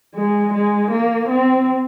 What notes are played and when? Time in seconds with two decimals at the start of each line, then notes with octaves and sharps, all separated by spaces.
0.15 G#3
0.53 G#3
0.91 A#3
1.29 C4